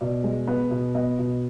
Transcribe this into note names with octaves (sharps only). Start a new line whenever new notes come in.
B2 D5
G#3
B3
B2
B3 D#5
B2